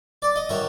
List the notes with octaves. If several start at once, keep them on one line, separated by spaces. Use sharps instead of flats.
D5
D#5
D#3 F#3 E5